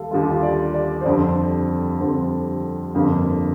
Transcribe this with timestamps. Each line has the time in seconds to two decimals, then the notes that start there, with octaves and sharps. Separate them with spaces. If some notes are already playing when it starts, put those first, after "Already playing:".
Already playing: D#2 G3 A4 F5
0.11 D#2 D3 G3 F4
0.21 G4
0.30 F4
0.43 D5
0.74 D5
1.01 C5
1.05 F2 D3 G3 C4 D5
2.00 F2 D3 G3 C4
2.95 G1 F2 D3 G3 A#3